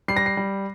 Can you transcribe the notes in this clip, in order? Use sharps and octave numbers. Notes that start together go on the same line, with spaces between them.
G3 C7
A#6
C7
G3